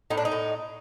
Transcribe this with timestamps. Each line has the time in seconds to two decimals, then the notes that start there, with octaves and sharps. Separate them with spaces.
0.10 A2 D#4
0.17 D4
0.25 D#4
0.32 A2